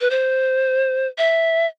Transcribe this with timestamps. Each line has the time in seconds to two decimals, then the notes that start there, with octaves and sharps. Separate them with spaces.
0.01 B4
0.10 C5
1.18 E5